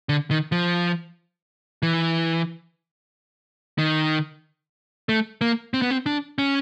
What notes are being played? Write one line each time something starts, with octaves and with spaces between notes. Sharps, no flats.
D3
D#3
F3
E3
D#3
A3
A#3
C4
B3
C4
D4
C#4